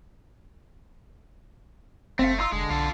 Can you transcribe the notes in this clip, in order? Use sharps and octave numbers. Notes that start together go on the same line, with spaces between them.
F#1 A3 C4 F5
D#4 F4 C6 E6
F1 D3 G#3
B1 F4 A4